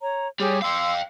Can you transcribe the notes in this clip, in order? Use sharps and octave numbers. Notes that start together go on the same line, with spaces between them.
C#5 A#5
G3 G4 G#4 C#5
F5 G5 C6 D6 E6